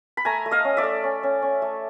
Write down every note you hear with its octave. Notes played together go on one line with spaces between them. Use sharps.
B5
A3 G#5 A#5
A3
D#5 F5
C#4
D5 E5
A3
C#4
C#4
C#4
A3